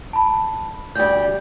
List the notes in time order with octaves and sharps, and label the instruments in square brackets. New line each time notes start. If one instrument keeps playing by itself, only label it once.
[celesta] A5 B5
[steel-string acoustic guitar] D2 G3 [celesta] G6